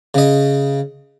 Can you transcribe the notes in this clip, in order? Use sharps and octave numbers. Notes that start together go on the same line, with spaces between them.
C#3 D#5